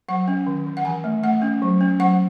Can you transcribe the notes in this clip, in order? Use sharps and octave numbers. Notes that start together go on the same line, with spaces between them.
F#3 F#5
C#4
D#3
D#3
F#5
E3 G#5
A3
A3 F#5
C#4
F#3
C#4
F#3 F#5